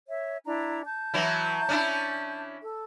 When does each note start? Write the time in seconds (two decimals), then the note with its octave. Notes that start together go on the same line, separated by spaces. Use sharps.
0.08 C#5 E5
0.44 D4 E4 A#5
0.85 A5 G6
1.14 E3 F#3 E4
1.69 C#4 D4 E4
2.62 A4